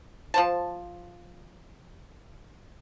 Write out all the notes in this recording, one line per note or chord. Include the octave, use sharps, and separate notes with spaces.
F3 C5 A5